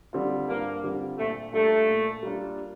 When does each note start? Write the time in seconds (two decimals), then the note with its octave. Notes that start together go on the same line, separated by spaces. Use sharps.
0.13 D3 G3 C4 F4
0.48 G2 A#3
0.84 D3 G3 C4 F4
1.18 A#2 A3
1.53 G3 A3 A#3 D4 F4
1.88 A#2
2.23 G3 A#3 D4 F4